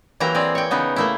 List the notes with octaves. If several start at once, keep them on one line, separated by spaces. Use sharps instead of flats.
E3 F#3 A#3 G4 A#5
C4 G#4 D5
C#5 G5
C#3 B3 D#4
A3 A#3 E4